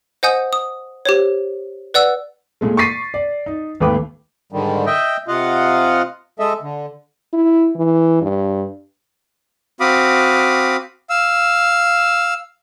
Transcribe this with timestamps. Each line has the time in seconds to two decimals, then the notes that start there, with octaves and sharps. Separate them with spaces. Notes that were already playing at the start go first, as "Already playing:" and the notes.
0.23 C5 D#5 F#5 G#5 D#6 G6
0.53 D#6
1.05 G4 C5 C#5
1.94 B4 D5 F#5 E6
2.61 A#2 G#3 A3
2.77 C#6 D6 A6 B6 C7 D#7
3.14 D5
3.46 D#4
3.80 G#1 D#2 A3 B4 G5 D6
4.52 G#2 D3 D#3 G3
4.86 D#5 E5 G5
5.28 C3 F4 D#5 F5 F#5
6.39 G#3 A4 D#5 E5
6.62 D3
7.34 E4
7.75 E3
8.22 G2
9.80 C4 F#4 F5 B5 D6 D#6
11.10 F5 E6